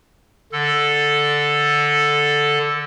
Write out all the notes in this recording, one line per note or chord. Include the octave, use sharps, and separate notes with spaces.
D3 A4